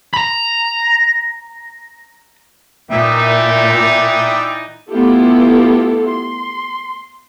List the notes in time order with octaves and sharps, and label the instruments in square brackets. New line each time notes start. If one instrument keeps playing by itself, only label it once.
[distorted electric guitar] A#5 B5
[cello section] A#2 [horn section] E3 D#4 [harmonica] D5 G5 [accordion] E5
[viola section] A3 B3 E4 F4 G4 A4
C6